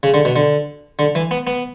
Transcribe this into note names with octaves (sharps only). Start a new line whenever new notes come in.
C#3
D3
B2
D3
D3
E3
B3
B3